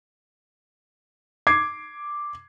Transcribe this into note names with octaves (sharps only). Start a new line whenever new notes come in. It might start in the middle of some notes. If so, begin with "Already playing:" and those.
D6 G#6 C7